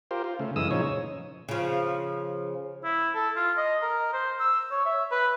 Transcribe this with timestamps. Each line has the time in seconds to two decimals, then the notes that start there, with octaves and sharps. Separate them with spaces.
0.11 F4 G4 A#4 C5
0.24 F4
0.39 C#3 A3
0.56 F#2 C#3 E3 G#3 D#6 E6
0.71 A#2 C#3 F3 D#4 C#5
1.49 C#3 F3
2.84 E4
3.15 A4
3.36 F4
3.57 D#5
3.82 A#4
4.13 C5
4.40 E6
4.71 C#5
4.85 E5
5.12 B4